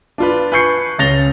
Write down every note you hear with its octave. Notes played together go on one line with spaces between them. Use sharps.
D4 F4 B4
B4 G#5 C#6 G6 C7 C#7
C#2 C#4 A6 A#6 F7 G7